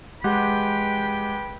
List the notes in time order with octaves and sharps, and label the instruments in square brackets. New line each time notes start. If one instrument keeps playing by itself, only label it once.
[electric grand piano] G#3 G4 F#5 [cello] B4 G5